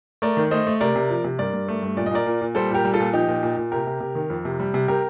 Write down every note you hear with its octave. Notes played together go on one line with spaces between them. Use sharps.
A3 A#4 D5
D#3
A3 C5 D#5
A3
C3 A#4 D5
C3
F3
C3
G2 A#4 D5
G2
A3
G2
A#2 D5
D#5
A#2 A#4 D5
A#2
A#2
G3 A4 C5
A#2 G4 A#4
G3
F4 A4
A#2
F3 D#4 G4
A#2
A#2
A#2
C3 G4 A#4
C3
C3
D#3
F2
C3
G3
C3
C3 G4 A#4